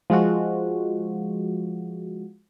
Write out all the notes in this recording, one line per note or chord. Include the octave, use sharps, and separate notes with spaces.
F3 G#3 F4 F#4